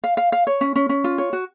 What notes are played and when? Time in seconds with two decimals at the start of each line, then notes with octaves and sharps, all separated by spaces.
0.04 F5
0.17 F5
0.32 F5
0.47 C#5
0.61 C#4
0.76 C#4
0.89 C#4
1.04 F4
1.18 C#5
1.33 F#4